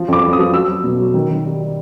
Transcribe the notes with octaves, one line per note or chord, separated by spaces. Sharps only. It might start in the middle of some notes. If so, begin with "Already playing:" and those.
Already playing: F3
F2 D6
F2
D#6
F3
F#3 E6
F#3
B2
F#3
D#3
D#3
G3
G3